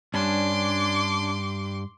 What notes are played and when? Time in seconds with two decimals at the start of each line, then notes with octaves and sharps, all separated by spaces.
0.14 G2 C#4 D4 C6 D6